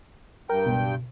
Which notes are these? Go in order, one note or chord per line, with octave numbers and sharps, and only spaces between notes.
G2 A#4 G5
C#2 B2